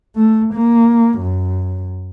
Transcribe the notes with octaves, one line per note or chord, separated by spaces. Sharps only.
A3
A#3
F#2